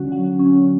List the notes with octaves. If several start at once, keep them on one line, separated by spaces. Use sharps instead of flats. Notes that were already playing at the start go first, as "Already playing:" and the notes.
Already playing: D3 F#3 C#4 F#4
F#3
C#4